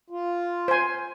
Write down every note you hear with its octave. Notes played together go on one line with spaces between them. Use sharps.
F4
C5 G#5